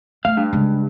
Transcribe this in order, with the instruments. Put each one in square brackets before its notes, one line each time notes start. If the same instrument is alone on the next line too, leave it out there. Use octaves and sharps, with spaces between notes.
[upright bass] A3 [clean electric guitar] F5
[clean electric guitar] G2
[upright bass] C#3 G#3